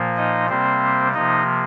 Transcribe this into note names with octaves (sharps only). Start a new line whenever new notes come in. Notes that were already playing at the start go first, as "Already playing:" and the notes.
Already playing: A#2 F3 A#3
D#4 D#5
C3 G3 A#3 C4 C5
C3 F3 A#3 D#4 D#5